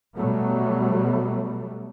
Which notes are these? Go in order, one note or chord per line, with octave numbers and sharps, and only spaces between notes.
B2 F#3 G3 A3 B3